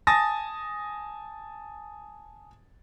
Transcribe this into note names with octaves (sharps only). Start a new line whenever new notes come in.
G#5 A5 D#6 A6 A#6